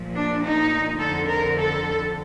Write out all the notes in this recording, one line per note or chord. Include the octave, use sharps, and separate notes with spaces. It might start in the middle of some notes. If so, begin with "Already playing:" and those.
Already playing: A#2 F3
D4
D#4
F2 D3 F3 A4
A#4
A4